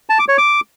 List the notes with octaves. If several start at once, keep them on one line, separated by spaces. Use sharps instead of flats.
A5
D6
C#5
D6